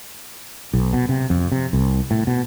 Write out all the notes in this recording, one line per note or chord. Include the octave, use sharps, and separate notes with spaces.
B1
B2
C3
F2
C3
C2
A2
B2